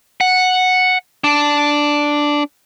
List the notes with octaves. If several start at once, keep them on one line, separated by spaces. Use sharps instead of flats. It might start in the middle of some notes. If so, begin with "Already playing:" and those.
F#5
D4